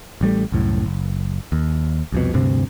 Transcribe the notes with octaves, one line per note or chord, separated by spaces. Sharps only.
A1 G3 A3
C2 F#2 A2
F#1
D#2
C2 F2 B2
D2 G2 C3 C4